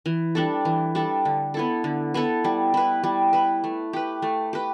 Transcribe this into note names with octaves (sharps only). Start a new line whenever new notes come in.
E3
G3 D4 A4
E3
G3 D4 A4
D3
B3 E4 A4
D3
B3 E4 A4
G3
E4 B4
G3
E4 B4
A3
G4 B4
A3
G4 B4